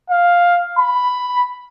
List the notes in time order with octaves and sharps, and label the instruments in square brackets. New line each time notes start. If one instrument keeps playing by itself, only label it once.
[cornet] F5
B5